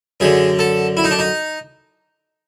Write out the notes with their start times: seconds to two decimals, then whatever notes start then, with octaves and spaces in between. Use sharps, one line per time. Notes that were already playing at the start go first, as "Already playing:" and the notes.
0.20 F#2 D3 G#4
0.59 A4
0.97 E4
1.04 D#4
1.11 D4
1.19 D#4